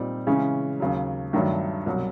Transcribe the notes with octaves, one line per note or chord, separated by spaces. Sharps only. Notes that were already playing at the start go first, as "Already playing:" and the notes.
Already playing: A#2 G3 C4 D#4
C#3 E3 G#3 C#4
D#2 C#3 F#3
G2 D#3 F#3 A3 D4
C2 B2 F#3